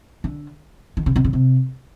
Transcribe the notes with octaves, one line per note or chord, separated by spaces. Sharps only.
D3
D#3
C#3
C3
C#3
C3